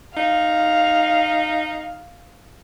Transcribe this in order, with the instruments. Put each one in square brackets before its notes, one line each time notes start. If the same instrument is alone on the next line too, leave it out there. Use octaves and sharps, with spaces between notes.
[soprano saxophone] D#4 [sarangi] F5